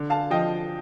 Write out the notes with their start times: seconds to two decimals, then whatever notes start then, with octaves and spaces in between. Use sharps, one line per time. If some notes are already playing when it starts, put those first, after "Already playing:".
Already playing: D3
0.10 F5 A5
0.30 F3 D#5 G5